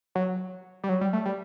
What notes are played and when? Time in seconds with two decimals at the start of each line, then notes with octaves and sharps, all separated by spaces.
0.15 F#3
0.84 G3
0.89 F#3
1.01 G3
1.13 A3
1.25 G3